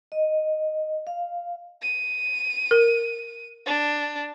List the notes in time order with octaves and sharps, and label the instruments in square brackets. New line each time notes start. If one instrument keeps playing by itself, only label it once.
[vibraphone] D#5
F5
[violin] D#7
[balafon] A#4
[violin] D4